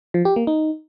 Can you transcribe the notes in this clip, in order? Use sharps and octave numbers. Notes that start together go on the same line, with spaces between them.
F3
G4
A#3
D#4